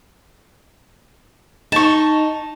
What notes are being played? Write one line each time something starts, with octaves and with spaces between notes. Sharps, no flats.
D#4 A5 C#6